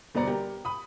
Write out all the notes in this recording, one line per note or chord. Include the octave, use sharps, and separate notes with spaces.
G1 B2 C5 D5 A#5 C#7
G4 A#4
B5 D#6